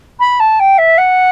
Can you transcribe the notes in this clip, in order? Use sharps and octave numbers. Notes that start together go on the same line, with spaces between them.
B5
A5
G5
E5
F#5